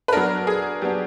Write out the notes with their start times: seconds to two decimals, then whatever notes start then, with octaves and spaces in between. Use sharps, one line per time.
0.08 B4
0.13 F#3 B3 D4 A#4
0.47 G#4
0.82 F#3 B3 D4 G4